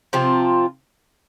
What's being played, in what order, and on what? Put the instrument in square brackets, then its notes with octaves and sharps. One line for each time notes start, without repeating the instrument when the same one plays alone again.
[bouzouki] C3 F3 C4 F4